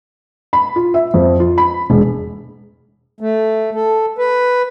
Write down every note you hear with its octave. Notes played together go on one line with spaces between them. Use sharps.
B5
F4
E5
F2
F4
B5
E1
A3
A4
B4